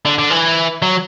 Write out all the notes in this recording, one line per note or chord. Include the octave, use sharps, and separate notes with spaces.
D3
D3
E3
F#3